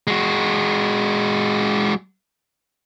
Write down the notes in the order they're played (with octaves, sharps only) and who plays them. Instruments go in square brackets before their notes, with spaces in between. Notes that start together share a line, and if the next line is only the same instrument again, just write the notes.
[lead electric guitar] G#3 F#4